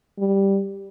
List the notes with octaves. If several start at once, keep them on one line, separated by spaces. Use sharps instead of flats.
G3